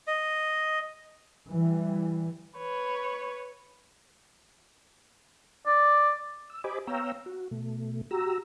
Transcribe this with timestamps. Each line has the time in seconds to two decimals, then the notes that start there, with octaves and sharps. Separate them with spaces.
0.07 D#5
1.50 E3 G3
2.57 B4 C#5
5.66 D5
6.50 E6
6.64 G4 C5 D#5 G#5 B5 D6
6.87 B3 C#5 F5 G5 A#5 E6
7.26 F#4
7.51 B2 A3
8.11 F#4 G4 A#5 E6